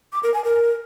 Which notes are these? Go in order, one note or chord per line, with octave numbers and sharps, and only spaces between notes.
D6
A#4
G#5
A#4